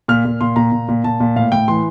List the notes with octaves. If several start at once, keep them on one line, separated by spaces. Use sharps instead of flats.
A#2 F6
A#2
A#2 C6
A#2 A#5
A#2
A#2
A#2 A5
A#2
A2 F5
A2 G5
E3 C6